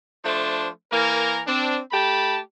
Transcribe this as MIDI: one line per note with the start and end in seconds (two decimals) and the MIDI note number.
0.24 0.68 53
0.24 0.68 57
0.24 0.68 62
0.24 0.68 72
0.92 1.41 52
0.92 1.41 58
0.92 1.41 70
1.47 1.79 60
1.47 1.79 62
1.92 2.39 57
1.92 2.39 67
1.92 2.39 81
1.92 2.39 83